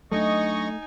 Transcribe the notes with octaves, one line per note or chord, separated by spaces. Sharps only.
F#3 A3 C4 D4 D#4 D#5 G#5 C#6